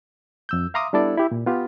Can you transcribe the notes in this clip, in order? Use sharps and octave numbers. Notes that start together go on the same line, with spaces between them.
F2 E6 G6
E5 F5 A#5 C6 D6 D#6
G3 B3 D4 E4 A4 D5
E4 G4
A#2
B3 F4 G4